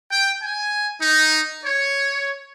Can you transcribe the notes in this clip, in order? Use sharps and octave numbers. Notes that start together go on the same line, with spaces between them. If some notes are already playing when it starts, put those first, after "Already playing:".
G5
G#5
D#4
C#5